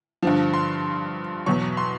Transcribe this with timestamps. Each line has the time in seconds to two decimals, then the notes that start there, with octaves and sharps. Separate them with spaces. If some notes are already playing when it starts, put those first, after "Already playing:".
0.22 G2 D3 F3
0.54 C6
1.46 E2 B2 F#3 C#6
1.77 C6